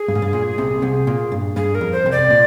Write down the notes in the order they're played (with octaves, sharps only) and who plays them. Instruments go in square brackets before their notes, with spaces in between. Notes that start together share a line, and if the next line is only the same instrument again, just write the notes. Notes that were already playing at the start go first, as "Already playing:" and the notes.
Already playing: [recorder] G#4
[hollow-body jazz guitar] G2
G#2
G2
A#2
C2 C3
C2 C3
A#2
G2
[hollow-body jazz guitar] G2 [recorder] G#4
[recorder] A#4
[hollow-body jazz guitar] F2
[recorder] C5
[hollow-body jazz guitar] C2 C3
[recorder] D5
[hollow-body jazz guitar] A#2